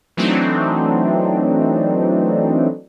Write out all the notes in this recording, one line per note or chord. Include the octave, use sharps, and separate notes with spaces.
E3 F#3 A3 C4 D4 D#4